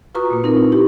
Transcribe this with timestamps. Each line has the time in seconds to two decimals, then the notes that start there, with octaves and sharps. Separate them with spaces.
0.15 F4 F#4 B4 A#5 C#6 D#6
0.30 A#2 A#3
0.44 C4 D#4 F4 A#4
0.57 E4
0.72 E4 G4 C#6